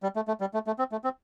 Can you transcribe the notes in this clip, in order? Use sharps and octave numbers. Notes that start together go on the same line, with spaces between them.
G3
A3
A3
G3
A3
A3
C4
A3
C4